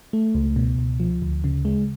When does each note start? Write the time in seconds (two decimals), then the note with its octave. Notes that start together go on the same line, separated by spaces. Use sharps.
0.13 A3
0.34 C#2
0.56 B2
0.79 C#2
1.00 F3
1.22 D2
1.44 C#3
1.65 G#3